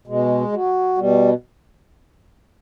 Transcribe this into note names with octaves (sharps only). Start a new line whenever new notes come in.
B2 G#3
F#3
B2 G3